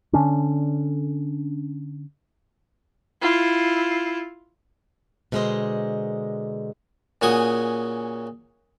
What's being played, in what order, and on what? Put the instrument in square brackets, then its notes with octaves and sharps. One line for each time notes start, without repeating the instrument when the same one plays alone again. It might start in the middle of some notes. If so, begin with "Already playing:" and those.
[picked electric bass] D3 C#4 D4
[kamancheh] E4 F4
[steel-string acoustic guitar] B2 D3 G#3 A#4 C5 D#5
[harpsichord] A#2 C#3 F#4 G#5 D#6